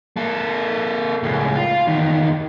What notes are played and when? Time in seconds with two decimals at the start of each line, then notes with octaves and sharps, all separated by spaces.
0.16 A#3 A4
1.23 C#2 A2
1.55 F4
1.87 E2 D#3